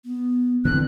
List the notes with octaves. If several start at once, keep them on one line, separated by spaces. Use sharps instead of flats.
B3
D3 E3 C4 D4 F#6